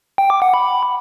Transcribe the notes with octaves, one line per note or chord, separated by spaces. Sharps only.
G5
D6
F#5
B5